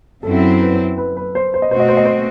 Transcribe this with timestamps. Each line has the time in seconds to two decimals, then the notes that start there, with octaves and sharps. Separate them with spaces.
0.23 F#2 F#3 C4 E4 A4
0.60 B4
0.98 B4
1.17 B4
1.35 C5
1.54 C5
1.62 D#5
1.71 B2 A3 C4 F#4 C5
1.80 D#5
1.89 C5
1.97 D#5
2.05 C5